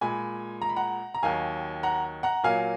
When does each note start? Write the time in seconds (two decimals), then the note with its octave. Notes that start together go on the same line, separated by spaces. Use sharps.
0.01 A#2 G#3 G#5 B5
0.62 A#5
0.69 B5
0.76 F#5 A#5
1.14 A#5
1.23 D#2 D#3 F#3 F5 G#5
1.83 F#5 A#5
2.23 F#5 A#5
2.43 A#2 F#3 A#3 F5 G#5